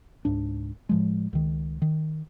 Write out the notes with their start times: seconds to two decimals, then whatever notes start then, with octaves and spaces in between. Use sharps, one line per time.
0.25 C#2 G#2 D4
0.89 A2 F3 G#3
1.33 C#2 D#3
1.82 D#3